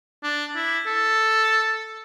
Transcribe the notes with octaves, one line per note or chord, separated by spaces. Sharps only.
D4
E4
A4